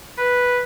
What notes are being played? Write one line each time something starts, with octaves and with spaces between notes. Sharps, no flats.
B4